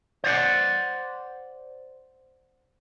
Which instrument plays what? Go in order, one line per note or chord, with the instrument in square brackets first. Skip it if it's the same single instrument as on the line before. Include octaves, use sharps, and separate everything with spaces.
[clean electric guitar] C5 D5 F#5